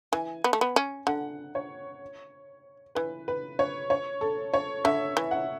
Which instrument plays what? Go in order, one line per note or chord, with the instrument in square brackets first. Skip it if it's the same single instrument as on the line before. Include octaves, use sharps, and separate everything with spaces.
[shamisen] E3 [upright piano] G#5
[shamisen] B3
A3
B3
C#4
[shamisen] D3 [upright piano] F#5
[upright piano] C#5
[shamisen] E3 [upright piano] B4
[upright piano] B4
C#5
C#5
A4
C#5
[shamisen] D3 [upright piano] E5
[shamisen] E3
[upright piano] F#5